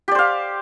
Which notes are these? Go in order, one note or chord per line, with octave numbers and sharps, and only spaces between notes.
G4 C5 D5 F5